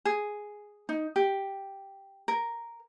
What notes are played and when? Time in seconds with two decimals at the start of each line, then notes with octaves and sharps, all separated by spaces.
0.05 G#4
0.89 D#4
1.16 G4
2.28 A#4